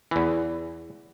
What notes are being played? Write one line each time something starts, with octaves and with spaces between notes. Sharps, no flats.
E2 E3